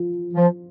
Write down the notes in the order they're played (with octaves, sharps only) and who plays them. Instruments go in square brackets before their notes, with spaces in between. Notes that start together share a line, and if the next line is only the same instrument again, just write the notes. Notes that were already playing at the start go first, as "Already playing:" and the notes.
Already playing: [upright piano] F3
[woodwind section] F3